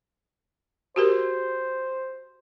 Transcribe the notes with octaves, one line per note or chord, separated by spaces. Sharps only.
F#4 G4 A#4 C5